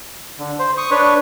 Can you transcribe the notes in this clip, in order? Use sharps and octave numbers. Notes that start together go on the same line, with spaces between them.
D3
C5
C#6 D#6
D4 B4 C#5